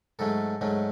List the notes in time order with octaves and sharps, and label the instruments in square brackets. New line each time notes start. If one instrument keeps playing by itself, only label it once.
[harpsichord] G#2 F#3 A3 C#4 A4
G#2 F#3 A3 C#4